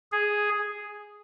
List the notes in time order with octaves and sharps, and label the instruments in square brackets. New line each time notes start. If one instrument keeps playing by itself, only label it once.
[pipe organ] G#4